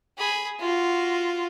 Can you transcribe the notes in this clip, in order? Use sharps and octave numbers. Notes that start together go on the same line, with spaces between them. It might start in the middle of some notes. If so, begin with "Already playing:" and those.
G#4 B5
F4 F#4